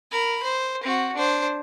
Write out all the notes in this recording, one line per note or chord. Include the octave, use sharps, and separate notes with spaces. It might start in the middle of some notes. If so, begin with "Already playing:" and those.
A#4 B5
C5
C4 F#4
D4 C5